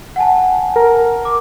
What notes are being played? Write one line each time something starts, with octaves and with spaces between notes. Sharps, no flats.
F#5 G#5 A5
A#4
D6